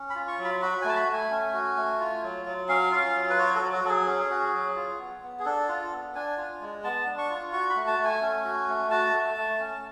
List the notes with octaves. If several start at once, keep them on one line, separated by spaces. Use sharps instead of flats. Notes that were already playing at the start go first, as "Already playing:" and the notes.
Already playing: C#4
B5
F4
C#6
F#3
B5
F#4 B5
G#5
A3 A5
B5
A3
G#5
C#4
F#4
A3
F4
F#3
F#3
C#4 F5
F4
F#3
B4
F#4 C#5
A4
F#3
F#4
F#3 A4
G#4
C#4
F#4
F#3
F4
B3
B3
G#4
D4 A4
F4
B3
D4 G#5
F4
G#3
B3 A5
D4
C#6
F4
F#4 C#6
B5
A3
A5
A3
G#5
C#4
F#4
A3
F#4 A5
A3
A3
C#4